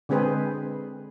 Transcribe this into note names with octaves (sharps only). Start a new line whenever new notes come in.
D3 G#3 C4 G#4 B4 C5